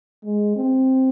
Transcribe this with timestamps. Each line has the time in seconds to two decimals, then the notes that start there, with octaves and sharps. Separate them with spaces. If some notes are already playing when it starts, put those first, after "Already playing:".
0.25 G#3
0.56 C4